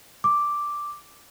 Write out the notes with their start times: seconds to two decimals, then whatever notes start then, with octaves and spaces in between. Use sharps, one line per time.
0.24 D6